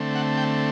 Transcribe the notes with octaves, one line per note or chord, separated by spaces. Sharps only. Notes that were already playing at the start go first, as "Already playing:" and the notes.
Already playing: D3 A3 C4
F#5
G5